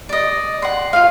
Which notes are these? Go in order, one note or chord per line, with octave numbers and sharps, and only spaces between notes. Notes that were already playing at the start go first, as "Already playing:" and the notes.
D5 D#5
F#5 C6
F4 F5